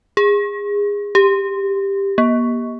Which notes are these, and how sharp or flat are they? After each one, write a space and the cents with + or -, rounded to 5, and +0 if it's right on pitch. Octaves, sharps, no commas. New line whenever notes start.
G#4 -25
G4 +10
A#3 +45